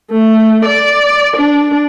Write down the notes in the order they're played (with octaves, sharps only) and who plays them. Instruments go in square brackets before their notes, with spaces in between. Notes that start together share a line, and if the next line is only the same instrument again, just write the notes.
[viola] A3
D5
D4